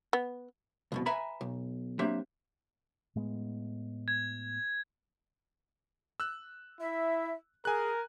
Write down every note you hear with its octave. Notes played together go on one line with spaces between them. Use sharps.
B3
C2 F2 B2
B4 E5 G#5 A#5 B5
B1
F#3 A#3 C4 D4 G4 E5
A2 G#3 B3
G#6
E6 F#6
E4 E5
G#4 A#4 G#5 F#6